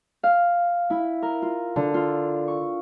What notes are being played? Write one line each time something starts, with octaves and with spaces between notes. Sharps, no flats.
F5
E4
A#4
F4
D3
F4
C#6